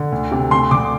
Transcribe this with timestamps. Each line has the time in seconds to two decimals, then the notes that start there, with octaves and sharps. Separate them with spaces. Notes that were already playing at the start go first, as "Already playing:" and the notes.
Already playing: D3
0.12 D2
0.32 C3
0.51 D2 C6
0.71 D3 D6